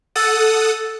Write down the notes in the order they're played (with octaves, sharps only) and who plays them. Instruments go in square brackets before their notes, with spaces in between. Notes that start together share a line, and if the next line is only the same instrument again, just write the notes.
[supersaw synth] A4 F#5 D#6 [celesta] E6 A6